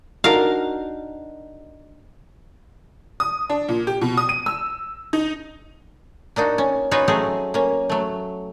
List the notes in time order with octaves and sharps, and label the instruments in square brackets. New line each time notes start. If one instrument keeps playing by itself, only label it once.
[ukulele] D4 D#4 F#4 [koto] A#4 F5
[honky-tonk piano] D#6
D4
A#2
G4
B2
D#6
D#7
E6
D#4
[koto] A#3 D4 D#4 F#4
C#4
C#4 D#4 F4 F#4 B4 C#5
F#3 A3 C4 C#4 D#4 G#4
A#3 C#4
F#3 A3